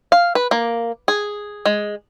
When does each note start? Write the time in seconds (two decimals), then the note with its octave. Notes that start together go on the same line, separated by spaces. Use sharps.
0.12 F5
0.35 B4
0.51 A#3
1.08 G#4
1.66 G#3